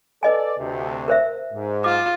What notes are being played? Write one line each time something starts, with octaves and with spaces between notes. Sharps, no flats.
A4 B4 D5 D#5 G#5
D2 C3
A#4 C5 E5
G#2
F4 D6